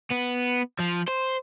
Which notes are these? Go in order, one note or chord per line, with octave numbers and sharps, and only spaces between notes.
B3
F3
C5